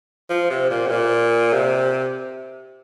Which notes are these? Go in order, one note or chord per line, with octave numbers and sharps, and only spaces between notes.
F3
C3
A#2
C3
A#2
C3